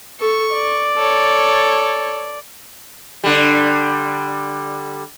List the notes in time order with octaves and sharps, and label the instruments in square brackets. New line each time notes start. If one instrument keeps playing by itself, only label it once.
[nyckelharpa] A4 [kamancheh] C#6
[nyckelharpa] D5
[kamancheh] A4 C#5
[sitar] D3 G3